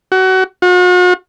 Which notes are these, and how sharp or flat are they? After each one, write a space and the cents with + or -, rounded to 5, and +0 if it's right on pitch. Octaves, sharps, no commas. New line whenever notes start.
F#4 +25
F#4 -45